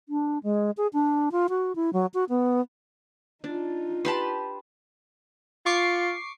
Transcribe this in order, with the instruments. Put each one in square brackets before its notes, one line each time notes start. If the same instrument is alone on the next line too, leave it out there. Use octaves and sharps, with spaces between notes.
[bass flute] D4
G#3
G#4
D4
F4
F#4
E4
F#3
F#4
B3
[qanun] D4 [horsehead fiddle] D#4 F4
[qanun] G4 B4 [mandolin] A5 B5 C6
[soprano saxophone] F4 [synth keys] C#6 D6 C7